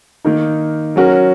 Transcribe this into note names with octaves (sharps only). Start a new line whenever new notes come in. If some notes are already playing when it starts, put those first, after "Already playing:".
D#3 A#3 D#4
F#3 C#4 F#4 A#4